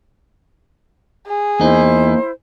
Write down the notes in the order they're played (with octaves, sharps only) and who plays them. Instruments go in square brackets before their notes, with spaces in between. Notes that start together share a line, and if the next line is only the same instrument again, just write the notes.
[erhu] G#4
[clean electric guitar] E2 D#4 [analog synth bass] A#3 [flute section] E4 C5